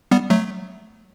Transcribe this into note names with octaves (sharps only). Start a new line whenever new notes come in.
G3 B3
F#3 A3